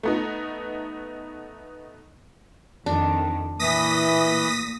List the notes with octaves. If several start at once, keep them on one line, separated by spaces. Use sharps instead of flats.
A3 B3 D#4
F2 D#3 D4
A#2 E3 D#6 A#6 B6